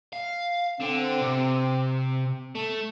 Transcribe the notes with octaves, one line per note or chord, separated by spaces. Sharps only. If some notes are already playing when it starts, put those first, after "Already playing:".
F5
D3 C4
C3
A3